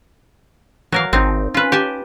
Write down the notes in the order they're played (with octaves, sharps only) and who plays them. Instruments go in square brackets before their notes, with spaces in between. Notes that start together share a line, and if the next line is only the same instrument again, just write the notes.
[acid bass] E3 [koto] F#3 A#4 F5
[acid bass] G#1 [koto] C4 D#4
[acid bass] C#4 [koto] F4 B4
[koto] G4 G#5 A5